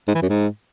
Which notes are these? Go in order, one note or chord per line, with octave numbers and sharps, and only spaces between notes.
G#2
E3
F#2
G#2